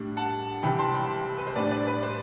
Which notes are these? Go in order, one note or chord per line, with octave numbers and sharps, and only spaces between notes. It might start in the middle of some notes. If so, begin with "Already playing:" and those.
Already playing: A2 G3 D4
F#5 A5
C2 C3 E3 G3 C4 G5 B5
A5 C6
G5 B5
B4
C5
A2 G3 D4 B4 D5
B4 D5
B4 D5
C5